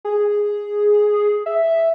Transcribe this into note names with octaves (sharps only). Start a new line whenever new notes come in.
G#4
E5